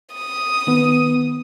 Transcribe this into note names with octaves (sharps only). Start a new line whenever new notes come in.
D#6
D#3 B3